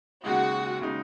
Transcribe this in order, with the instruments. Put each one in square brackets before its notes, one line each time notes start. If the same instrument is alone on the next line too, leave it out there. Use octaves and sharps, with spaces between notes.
[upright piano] D#2 C#3 G#3 D#4 [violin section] F#4
[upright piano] C#3 G#3 D#4